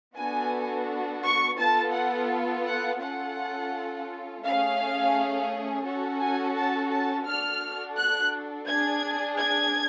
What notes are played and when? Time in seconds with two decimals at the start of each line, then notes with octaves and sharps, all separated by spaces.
0.16 B3 D4 F#4 A4 G#5
1.23 C#6
1.58 B3 F4 A4 A5
1.94 F#5
2.65 F#5
3.01 C#4 F4 A4 F#5
4.43 A3 C#4 G#4 F5
5.84 C#4 F#4 A4
6.20 G#5
6.56 A5
6.92 A5
7.26 D4 F#4 A4 F6
7.98 F#6
8.69 D4 G#4 G#6
9.39 G#6